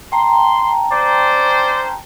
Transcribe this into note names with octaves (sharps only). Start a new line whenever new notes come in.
G5 A5 A#5 C6
C#4 C5 D5